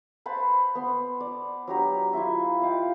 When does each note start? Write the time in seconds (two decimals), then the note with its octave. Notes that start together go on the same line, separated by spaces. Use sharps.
0.26 B4 C5 A5 B5
0.75 B3 C6
1.20 D5
1.68 F#3 D4 G4 A#5
2.13 E4 F4 E5
2.62 D#5 F5 G5